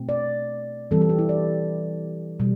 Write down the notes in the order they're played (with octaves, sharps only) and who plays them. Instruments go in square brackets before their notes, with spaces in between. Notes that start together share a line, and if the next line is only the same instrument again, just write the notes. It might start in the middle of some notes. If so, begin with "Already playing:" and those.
Already playing: [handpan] B2 A3 C4
D5
E3 G3 C4 A4
A4
G4
E4
D5
B2 G3